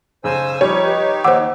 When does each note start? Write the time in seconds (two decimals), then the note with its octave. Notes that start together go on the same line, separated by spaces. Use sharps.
0.24 B1 C#3 C5 G#5 E6
0.61 F3 G3 D#4 G4 C#5
0.83 B4
1.24 D#2 C5 F#5 D6 E6